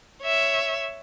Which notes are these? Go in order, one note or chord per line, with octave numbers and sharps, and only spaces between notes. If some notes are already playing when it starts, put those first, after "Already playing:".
C#5 E5